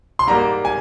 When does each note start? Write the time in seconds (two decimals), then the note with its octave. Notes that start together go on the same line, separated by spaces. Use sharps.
0.19 C6
0.27 G#2 G3 A#3 A#5
0.65 G#5